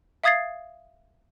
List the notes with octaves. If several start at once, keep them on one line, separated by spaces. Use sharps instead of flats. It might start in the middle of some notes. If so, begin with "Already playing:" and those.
E5 F5 D#6 G#6 A6 C7